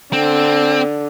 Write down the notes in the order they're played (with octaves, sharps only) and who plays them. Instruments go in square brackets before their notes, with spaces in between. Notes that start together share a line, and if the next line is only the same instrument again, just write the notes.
[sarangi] D3 [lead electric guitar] C4